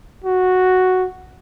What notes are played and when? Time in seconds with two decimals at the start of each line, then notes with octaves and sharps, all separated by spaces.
0.24 F#4